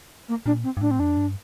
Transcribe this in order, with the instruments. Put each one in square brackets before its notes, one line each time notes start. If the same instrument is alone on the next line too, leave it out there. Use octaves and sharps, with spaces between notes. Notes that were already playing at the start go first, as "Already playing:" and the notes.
[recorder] A#3
[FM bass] A#2 [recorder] D4
[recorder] C4
[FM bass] G2
[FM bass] A2 [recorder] D4
[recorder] C4
[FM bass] F2 [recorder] D4
[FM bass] G2